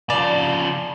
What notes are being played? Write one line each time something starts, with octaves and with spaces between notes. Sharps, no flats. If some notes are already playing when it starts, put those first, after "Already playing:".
C#3 F3 D5